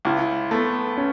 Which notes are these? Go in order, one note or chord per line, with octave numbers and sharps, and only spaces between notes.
C#2 E4
A3 B3
C#4